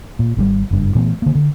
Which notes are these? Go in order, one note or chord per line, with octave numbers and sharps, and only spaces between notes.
A#2
G#1 B2 G3
F#1 G2
A#2 E3 A3 B3
D3 A#3
D3